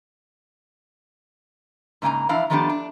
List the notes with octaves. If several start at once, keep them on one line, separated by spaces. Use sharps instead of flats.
G#2 C#3 A#3 G#5 A#5
E3 F3 D4 E4 F5
D#3 F3 A3 B3 D4 G4
D4